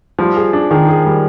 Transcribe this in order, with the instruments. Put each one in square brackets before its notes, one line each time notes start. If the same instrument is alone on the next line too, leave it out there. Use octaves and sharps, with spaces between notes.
[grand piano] F3 [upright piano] G3
[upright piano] G#4
D4
[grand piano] D#3 [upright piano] G#4
[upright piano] G#4
G3